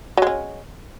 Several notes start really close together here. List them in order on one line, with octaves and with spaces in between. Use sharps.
F#3 G#3 C#4